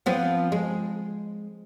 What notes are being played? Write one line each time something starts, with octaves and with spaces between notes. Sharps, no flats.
F3 B3 C4
G#3